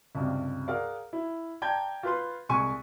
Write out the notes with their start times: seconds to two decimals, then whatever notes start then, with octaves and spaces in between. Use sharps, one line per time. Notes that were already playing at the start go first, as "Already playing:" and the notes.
0.15 C#2 G2 C3
0.68 G#4 A#4 D5 F5 F#5
1.13 E4
1.62 D5 G5 A5 A#5 G6 G#6
2.03 F4 B4 C6
2.49 C2 G#3 G#5 C#6 D#7